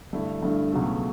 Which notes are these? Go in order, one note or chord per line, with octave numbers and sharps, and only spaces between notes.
G2 D3 A3 E4
G2 D3 A3 E4
C#2 B2 F#3 A3